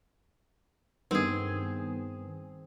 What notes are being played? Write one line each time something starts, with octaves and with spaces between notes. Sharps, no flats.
G2 D#3 B3 C4 G#4